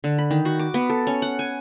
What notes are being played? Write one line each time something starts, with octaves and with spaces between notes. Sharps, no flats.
D3
B5
D#3
F#4
D6
B3
A4
C#4
F#5
G#5